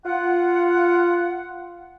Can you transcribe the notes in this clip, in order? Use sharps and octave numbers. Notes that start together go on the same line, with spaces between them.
F4 F#5